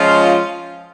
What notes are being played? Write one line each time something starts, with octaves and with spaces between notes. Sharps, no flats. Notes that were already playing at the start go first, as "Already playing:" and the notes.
Already playing: F3 G#3 C#4 F4